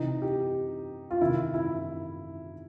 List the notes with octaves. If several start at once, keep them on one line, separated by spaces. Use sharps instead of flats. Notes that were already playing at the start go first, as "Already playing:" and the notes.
Already playing: C3 E3 D#4
G4
F4
C3 D#3 E4
E4